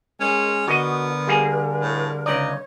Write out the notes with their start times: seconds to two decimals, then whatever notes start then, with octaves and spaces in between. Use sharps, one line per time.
0.20 G#3 C#4 A#4
0.68 D3 B3 F#4 A#4 D#5
1.27 G3 A#3 G#4
1.82 A2
2.26 C#2 D#4 C#5 D5